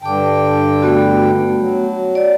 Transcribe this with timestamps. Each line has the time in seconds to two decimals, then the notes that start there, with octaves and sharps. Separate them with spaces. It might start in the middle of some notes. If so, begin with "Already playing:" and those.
0.02 G2 D3 G5 A5 D6
0.82 A3 B3 F#4
1.60 F#3
2.15 D5